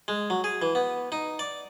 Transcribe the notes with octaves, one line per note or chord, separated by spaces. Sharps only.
G#3
F#3
G#4
E3
B3
D#4
D5